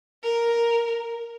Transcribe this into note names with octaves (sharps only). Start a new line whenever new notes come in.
A#4